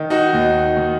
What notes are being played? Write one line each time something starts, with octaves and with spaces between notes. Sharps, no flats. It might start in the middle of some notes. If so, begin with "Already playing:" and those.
Already playing: D#3
D#4 F#4
D#2
D#3